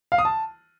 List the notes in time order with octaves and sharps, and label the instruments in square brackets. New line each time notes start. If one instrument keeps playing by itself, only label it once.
[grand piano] F5
D#6
A5